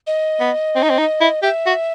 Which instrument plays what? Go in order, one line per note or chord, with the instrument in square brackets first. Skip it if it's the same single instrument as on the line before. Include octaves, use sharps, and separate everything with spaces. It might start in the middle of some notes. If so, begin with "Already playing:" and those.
[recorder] D#5
[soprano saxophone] B3
C4
D#4
C4
D#4
E4
[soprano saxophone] G4 [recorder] E5
[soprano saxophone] F#4